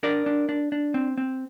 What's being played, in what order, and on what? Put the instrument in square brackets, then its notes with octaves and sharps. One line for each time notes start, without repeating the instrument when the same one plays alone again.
[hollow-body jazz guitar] D4 A#4 D5
D4
D4
D4
C4
C4